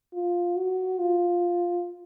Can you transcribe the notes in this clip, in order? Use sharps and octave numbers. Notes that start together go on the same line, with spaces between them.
F4
F#4
F4